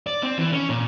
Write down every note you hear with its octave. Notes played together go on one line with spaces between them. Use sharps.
D5
C4
E3
C#4
A#2